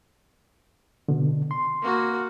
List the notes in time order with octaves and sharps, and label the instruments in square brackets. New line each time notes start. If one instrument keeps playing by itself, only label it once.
[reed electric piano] B2 D3
C6
[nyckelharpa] A#3 F#4